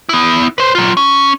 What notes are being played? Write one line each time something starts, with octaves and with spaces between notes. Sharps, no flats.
B3 E4
B4 C5
F#3 F4
C#4